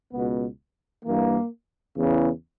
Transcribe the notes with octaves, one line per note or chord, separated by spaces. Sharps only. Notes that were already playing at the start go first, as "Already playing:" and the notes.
C#2 B2 B3
G2 E3 A#3
E2 C#3 E3